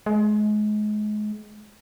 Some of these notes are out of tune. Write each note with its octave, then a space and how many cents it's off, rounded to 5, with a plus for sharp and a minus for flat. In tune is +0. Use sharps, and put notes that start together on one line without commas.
G#3 +30